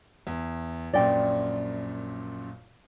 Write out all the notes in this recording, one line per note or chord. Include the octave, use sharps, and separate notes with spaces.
E2
A#1 F#2 A#2 D5 G5